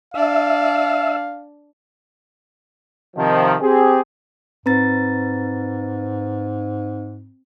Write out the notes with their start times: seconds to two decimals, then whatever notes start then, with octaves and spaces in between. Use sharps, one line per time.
0.14 D4 E5 F5
3.17 C3 D#3 F3
3.61 C4 G4 G#4
4.66 G#2 C4 B4 A#5 A6